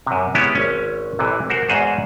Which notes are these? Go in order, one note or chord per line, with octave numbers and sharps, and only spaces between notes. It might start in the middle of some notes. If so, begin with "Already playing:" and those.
F#2 C3
G#3 B3 C#4 E4 G4
G#1 C#4
A1 C3 E3
F#4 A#4 C5
E2 G#2 C#4 F#4 G#4 C5